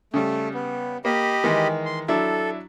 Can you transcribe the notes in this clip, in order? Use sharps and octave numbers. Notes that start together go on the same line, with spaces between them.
C#3 G3 A3
B3
A#3 G4 D#5 B5
D#3 E3 G#3
C6
F#3 D4 E4 A4